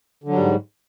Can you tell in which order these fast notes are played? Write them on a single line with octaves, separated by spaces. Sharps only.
D3 F#3 G3 G#2